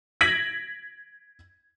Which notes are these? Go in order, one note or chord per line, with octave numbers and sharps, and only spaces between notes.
G#6 A#6 B6 D7 F#7